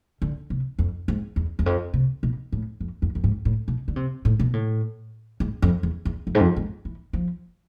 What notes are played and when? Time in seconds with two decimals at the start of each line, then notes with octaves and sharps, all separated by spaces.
0.22 D3
0.50 C3
0.79 F2
1.08 G#2
1.36 E2
1.59 E2
1.66 F2
1.94 C3
2.23 B2
2.52 A2
2.80 F2
3.02 F2
3.15 F2
3.24 G#2
3.45 A2
3.68 B2
3.88 D3
3.96 C3
4.25 A2
4.40 B2
4.53 A2
5.40 G#2
5.62 F2
5.83 E2
6.05 E2
6.27 F2
6.35 G#2
6.41 F2
6.56 G#2
6.85 E3
7.13 F3